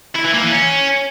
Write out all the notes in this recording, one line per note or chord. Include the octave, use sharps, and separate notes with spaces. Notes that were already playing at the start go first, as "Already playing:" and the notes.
E4
E3
A#3
E3
C#4